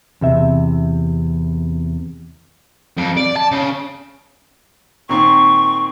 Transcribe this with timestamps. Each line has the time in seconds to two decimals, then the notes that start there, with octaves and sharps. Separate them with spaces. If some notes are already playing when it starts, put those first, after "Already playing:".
0.21 E2 C3 E5
2.98 F2
3.17 D5
3.37 A5
3.51 C#3
5.09 A#2 D#3 C4 C#6